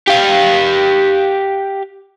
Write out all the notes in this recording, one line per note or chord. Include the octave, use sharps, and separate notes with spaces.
G4 F5